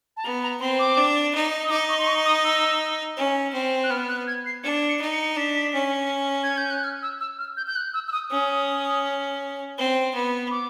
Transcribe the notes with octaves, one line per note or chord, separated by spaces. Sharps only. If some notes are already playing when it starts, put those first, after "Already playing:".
A5
B3 A#5
A#5
C4 C6
D6
D4
D#4
D#6
D#4 D6
C#6
C6
C#6
D#6
E6
C#4
C4
F#6
B3 F6
F#6
G#6
C7
D4 C#7
C#7
D#4
C#7
D4 B6
C#4
G#6
G6
F#6
F6
E6
E6
F6
G6
G6
F#6
E6
E6
D#6
C#4 D#6
C4
B3
D6